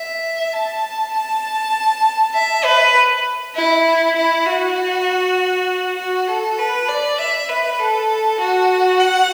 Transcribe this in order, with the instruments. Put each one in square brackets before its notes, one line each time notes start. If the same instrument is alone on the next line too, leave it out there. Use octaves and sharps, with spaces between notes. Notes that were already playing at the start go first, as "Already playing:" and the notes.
Already playing: [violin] E5
A5
A5
E5
B4
E4
E4
F#4
F#4
A4
B4
D5
E5
B4
A4
F#4
F#5